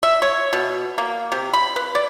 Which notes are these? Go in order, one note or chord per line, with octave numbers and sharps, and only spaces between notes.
E5
C#5
B2
A#3
C3
B5
B4
D5